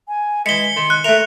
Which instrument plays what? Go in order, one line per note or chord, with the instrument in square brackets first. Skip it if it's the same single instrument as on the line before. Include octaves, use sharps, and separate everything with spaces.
[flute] G#5
[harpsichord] E3 G#3 [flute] B6 [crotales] C#7 G7
[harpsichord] D#3 [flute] C6
[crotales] F#6
[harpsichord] A3 A#4 [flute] E5 [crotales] F7